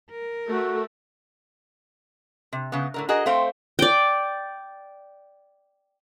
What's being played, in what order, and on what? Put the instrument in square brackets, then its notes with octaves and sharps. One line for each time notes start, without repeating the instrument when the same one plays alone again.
[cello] A#4
[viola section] A3 [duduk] F#4
[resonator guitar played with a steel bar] C3
C#3 B3
A2 D3 A#4
F#4 G#4 A#4 D#5
A3 C4 C5 F5 G5
[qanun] D5 G5